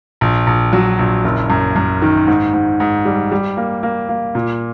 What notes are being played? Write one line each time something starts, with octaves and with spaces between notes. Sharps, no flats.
A#1
A#1
F#3
A#1
F#1
F#2
F#2
D#3
G#2
G#2
G#2
G3
G3
A#3
A#3
A#3
A#2